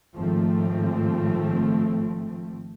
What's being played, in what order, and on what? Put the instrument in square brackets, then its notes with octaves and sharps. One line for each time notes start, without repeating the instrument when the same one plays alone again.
[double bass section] G#1 F3 A3 C4